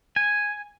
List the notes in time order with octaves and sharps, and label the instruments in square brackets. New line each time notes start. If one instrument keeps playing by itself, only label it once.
[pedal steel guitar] G#5